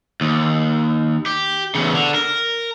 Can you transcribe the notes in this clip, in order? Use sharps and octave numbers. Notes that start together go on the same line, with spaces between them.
D#2
G4
E2 C#3
D3
A#4